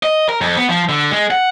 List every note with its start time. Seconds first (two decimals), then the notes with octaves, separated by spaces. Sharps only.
0.03 D#5
0.29 A#4
0.41 F2
0.57 B3
0.69 F3
0.89 D3
1.11 G#3
1.31 F#5